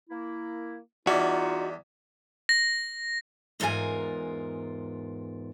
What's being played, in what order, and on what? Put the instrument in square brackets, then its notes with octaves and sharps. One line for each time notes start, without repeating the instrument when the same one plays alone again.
[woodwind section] A#3 E4
[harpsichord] E2 G3 [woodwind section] D#4 F4 [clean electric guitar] F#4
[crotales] A#6
[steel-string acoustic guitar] E2 G#2 F4 A#4 G#5